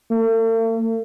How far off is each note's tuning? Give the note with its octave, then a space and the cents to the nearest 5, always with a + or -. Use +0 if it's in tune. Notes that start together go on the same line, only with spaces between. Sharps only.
A3 +45